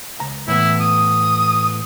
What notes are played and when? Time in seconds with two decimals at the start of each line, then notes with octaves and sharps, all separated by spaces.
0.20 C#2 A#5
0.48 A2 E3 B3 E4
0.81 D#6